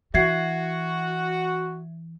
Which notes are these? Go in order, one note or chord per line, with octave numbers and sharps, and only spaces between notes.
E3 F#4 E5 G#6 C7